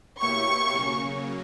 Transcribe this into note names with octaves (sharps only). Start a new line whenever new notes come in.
B2 A#3 E4 G4 C#5 C#6
C#3 F#3 A#3 C#4